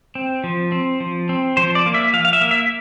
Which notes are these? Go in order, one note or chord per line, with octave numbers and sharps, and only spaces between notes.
C4
F3
C4
F3
C4
F3 C5
D5
A#3
E5
F3 F5
F5
E5
A#3
E5